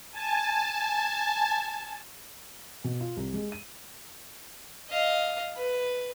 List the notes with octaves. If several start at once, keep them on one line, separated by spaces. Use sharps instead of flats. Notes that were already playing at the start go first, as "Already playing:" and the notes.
G#5 A5
B2
F4
C2
G#3
D#7
D#5 F5
B4